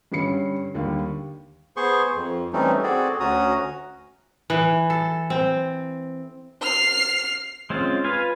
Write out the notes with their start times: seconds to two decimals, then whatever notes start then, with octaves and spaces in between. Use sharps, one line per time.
0.12 G2 D3 G3 C#4 C7 C#7
0.74 D#2 D3 G3 F5
1.77 B3 G#4 C5 C6 C#6
2.16 F2
2.53 E3 G3 A3 C4 C#4 D#4
2.83 C4 F#4 G#4 A4 D5
3.20 D2 C#4 F#4 A#5 D#6
4.50 E3
4.90 A4
5.30 C4
6.61 F6 C7
7.70 G#3 C4 C#4 F4
8.04 F4 B4 F5 G#5